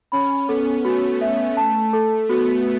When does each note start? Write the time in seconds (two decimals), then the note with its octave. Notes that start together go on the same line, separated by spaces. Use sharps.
0.12 C#4 B5
0.48 B3 A4
0.85 A3 F#4
1.21 E5
1.57 A5
1.93 A4
2.29 B3 F#4